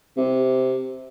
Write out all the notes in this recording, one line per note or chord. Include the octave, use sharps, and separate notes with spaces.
C3